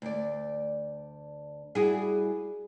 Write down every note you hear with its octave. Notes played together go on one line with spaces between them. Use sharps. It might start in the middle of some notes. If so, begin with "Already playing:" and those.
D2 D5
G3 E4 F#4 G#4